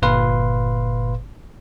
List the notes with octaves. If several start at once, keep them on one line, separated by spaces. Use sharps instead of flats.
G1 A#2 B4 F5 C6